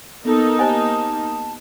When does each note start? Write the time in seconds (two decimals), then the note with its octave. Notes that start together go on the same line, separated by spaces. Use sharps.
0.25 A#3 B3 D#4 A4
0.59 G4 C5 D#5 G#5 A5